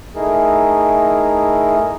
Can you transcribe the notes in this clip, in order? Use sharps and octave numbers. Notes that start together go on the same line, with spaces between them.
A3 D#4 E4 G#4 A#4